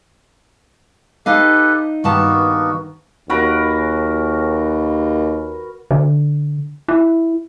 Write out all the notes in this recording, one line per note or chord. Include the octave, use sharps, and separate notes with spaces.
D#4 G4 A4 B4 D#5 F5
G2 D#3 A#3 B3 F#4 A5
D#2 F#4 A#4 B4
D3
E4